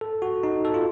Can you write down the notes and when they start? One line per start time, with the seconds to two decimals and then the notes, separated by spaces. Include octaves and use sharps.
0.01 A4
0.22 F#4
0.43 D#4
0.65 A4
0.74 F4